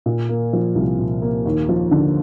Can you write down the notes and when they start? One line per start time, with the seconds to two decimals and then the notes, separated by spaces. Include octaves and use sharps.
0.06 A#2
0.29 A#3
0.53 F3
0.75 C2
0.99 A#2
1.22 A#3
1.46 D#2
1.69 F3
1.91 D3